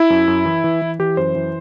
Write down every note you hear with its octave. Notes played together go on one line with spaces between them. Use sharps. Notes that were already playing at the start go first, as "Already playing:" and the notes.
Already playing: E4
F#2
F#2
E3
E3
E3
E3 G4
F#2 C5
E3